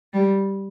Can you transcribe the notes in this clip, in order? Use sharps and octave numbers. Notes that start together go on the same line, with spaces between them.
G3